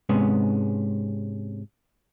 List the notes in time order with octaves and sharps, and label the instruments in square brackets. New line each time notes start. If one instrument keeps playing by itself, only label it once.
[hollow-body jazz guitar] G#2 C3 G#3 B3 C#4